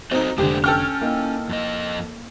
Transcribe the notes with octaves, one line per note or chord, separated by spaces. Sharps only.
C4 D#4 F#4 A4 D#5
F1 D3 G#3 A#3 G4 C5
C#4 A4 G5 F6
A#3 D#4 E4
F2 D#5